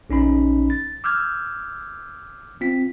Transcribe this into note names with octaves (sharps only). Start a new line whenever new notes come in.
A#1 C#4 D#4 B5
A6
D6 E6 F6 G6 G#6
C4 F4 B6